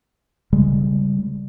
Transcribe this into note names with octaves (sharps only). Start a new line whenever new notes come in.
C#3 G3 G#3